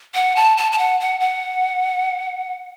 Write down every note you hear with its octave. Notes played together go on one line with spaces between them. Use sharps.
F#5
A5
A5
A5
F#5
F#5
F#5